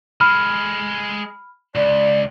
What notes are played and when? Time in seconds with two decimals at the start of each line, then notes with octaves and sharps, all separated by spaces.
0.21 G#3 A4 B5 F6
1.75 C#2 D5